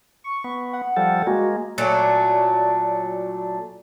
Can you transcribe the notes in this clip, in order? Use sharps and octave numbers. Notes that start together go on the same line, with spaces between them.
C#6
B3
F#5
F3 G3 A4
G#3 A#3 F#4
A#2 F#3 A3 D4